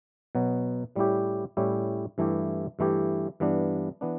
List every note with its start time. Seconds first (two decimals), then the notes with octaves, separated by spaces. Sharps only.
0.35 B2 F#3 B3
0.96 A2 G3 C#4 E4 G4
1.57 A2 G3 C#4 E4 G4
2.18 G2 E3 A3 E4 G4
2.79 G2 E3 A3 E4 G4
3.40 G2 E3 B3 D4
4.01 E3 B3 D4